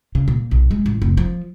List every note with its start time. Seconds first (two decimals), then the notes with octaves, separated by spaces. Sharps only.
0.15 C#3
0.28 A#2
0.51 B1
0.71 G#3
0.86 A1
1.02 F1
1.17 F3